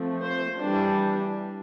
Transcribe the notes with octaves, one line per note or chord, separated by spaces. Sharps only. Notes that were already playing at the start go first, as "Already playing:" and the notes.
Already playing: F3 A3 C4
C5
E3 G3 D4